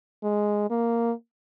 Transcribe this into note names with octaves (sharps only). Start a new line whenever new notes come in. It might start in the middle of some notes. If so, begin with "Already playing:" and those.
G#3
A#3